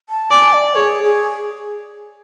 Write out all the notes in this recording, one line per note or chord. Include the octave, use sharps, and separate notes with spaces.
A5
D5 G#5
D5
G#4 C#5
G#4